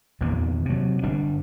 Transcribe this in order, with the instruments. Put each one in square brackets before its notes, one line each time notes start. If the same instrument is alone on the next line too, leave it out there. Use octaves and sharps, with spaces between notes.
[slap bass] E2 G2 A#2 D#3
C3 F#3
G1 G3 D4